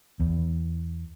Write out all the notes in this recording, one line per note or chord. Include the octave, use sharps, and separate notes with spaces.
E2